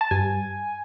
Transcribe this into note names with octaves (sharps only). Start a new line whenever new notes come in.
A5
G2 G#5